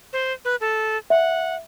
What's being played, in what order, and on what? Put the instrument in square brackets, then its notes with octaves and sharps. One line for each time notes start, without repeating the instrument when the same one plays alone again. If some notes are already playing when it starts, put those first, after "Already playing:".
[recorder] C5
B4
A4
[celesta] E5 [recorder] F#5